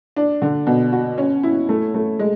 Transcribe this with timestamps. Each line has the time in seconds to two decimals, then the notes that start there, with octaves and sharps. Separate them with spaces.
0.16 D4
0.42 D3
0.67 B2
0.92 F#4
1.18 C#4
1.43 E4
1.69 A3
1.94 A3
2.19 G#3